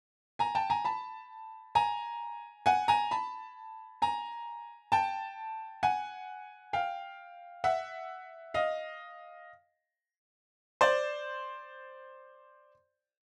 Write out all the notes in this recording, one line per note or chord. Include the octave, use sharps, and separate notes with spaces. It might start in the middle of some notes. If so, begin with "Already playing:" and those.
G#5 A#5
G5 A5
G#5 A#5
A5 B5
G#5 A#5
F#5 G#5
G#5 A#5
A5 B5
G#5 A#5
G5 A5
F#5 G#5
F5 G5
E5 F#5
D#5 F5
C5 D5